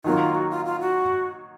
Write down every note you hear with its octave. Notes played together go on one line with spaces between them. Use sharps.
D#3 F#3 A#3 F4
F#4
F4
F4
F#4